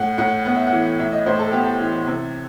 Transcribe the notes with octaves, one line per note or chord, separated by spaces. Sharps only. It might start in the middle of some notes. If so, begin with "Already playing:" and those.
Already playing: A2 F#5
A2 F#5
B3 F#5
E5
F#5
E3
A2 E5
D#5
A2 C5
A4
B3 G4
A4
E3
C3